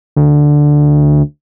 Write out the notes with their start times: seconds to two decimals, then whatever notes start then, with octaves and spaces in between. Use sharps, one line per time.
0.16 D2